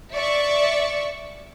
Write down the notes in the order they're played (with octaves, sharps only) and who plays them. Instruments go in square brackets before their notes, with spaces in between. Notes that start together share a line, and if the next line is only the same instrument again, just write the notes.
[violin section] D5 E5 C#6 C#7